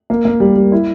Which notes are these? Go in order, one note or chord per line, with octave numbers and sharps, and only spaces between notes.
A#3
A#3
G3
G3
E4